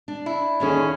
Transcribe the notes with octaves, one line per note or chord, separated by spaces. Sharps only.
D4
E4
D#2 D3 C#4 G#4